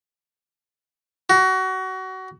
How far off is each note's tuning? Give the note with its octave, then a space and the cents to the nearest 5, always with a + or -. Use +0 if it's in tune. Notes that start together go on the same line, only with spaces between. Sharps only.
F#4 +25